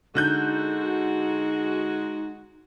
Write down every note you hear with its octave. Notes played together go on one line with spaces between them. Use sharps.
D3 G#3 D#4 F#4 F#6 G6